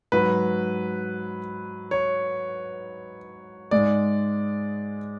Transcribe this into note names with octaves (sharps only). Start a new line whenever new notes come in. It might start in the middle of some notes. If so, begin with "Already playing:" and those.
G#2 F#3 B4
C#5
G#2 G#3 D5